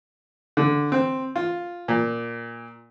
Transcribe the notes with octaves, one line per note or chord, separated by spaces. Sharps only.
D3
C4
F4
A#2